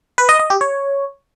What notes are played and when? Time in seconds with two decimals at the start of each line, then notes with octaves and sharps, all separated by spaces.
0.18 B4
0.29 D#5
0.39 D#5
0.50 G4
0.61 C#5